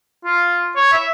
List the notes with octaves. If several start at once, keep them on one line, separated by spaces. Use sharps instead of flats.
F4
C#5
E5